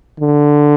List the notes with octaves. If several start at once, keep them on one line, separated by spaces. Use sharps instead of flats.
D3